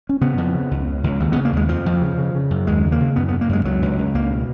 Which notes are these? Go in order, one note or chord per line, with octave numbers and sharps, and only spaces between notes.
C#4
C#3 B3
F2
C#3
C#2
C#3
C#2
D#2
C#3 B3
A#3
D#2 G#3
F2 F3
F2
C#3
C#3
C#3
F#2
D#2 G#3
C#3
A#3
C#3
F#2 B3
B3
C#3
A#3
F#2 G#3
C#2 F#3
C#2
C#2
C#2 A#3
B2